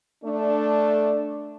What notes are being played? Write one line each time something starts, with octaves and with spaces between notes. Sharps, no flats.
A3 D4